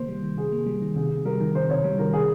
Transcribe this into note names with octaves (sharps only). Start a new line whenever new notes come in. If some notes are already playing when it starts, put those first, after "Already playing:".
Already playing: C3 D#3 A#3 C5
G3
D#3
C3 G#4
A#3
G3
D#3
C3 G#4
C3
G3 A#4
D#3
C3 C5
C3 C#5
G3
D#3 A#4
C3 G#4